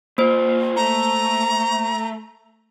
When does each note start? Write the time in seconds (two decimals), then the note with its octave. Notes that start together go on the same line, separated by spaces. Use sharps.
0.18 C2 A#3 F4 C5
0.77 A3 A#5